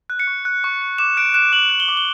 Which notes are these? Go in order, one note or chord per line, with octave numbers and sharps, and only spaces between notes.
F#6
C#7
C#6
F#6
C#6
C#6
D6 E7
F#6 D7
F#6 E7
D6 F#7
F#6
G7
D6
G7